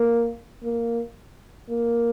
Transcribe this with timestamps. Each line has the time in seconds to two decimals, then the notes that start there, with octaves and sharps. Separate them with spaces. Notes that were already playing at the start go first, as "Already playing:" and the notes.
Already playing: A#3
0.64 A#3
1.70 A#3